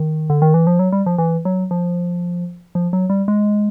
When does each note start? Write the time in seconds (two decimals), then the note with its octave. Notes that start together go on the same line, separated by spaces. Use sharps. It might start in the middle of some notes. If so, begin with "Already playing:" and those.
Already playing: D#3
0.30 D3
0.42 D#3
0.54 E3
0.67 F3
0.79 F#3
0.93 G3
1.06 F3
1.18 E3
1.45 F#3
1.71 F3
2.75 F3
2.93 F#3
3.10 G3
3.28 G#3